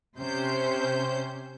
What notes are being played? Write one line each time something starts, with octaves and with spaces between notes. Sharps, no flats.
C3 C#4 C5 G6